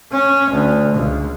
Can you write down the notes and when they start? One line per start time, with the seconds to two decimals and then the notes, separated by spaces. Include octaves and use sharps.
0.12 C#4
0.51 D2
0.96 C#2